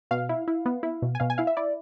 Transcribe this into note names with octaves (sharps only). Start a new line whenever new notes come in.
B2 F5
E4
E4
B3
E4
B2
G#5
B2 F5
G#5
E4 F5
E5
E4 D5